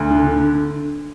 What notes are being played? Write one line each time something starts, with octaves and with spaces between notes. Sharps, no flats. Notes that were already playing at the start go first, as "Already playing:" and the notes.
Already playing: D2
D3
D3